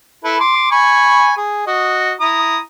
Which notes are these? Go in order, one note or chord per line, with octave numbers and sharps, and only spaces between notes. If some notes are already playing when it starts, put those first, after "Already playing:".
E4 A4 B4
C6 D6
G#5 B5 C#6
G#4
F#4 D#5
E4 A#5 D#6